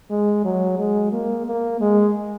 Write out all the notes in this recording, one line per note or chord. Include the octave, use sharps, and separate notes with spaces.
G#3
F#3
G#3
A#3
A#3
G#3